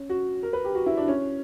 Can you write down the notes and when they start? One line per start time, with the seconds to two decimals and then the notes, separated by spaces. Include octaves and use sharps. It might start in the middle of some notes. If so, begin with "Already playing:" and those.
Already playing: C#4
0.10 F#4
0.43 A#4
0.53 B4
0.65 G4
0.75 F#4
0.86 E4
0.97 D4
1.08 C#4